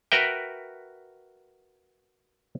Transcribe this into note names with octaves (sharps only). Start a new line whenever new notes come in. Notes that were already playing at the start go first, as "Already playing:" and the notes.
F#4 A#4 B4 E5 G5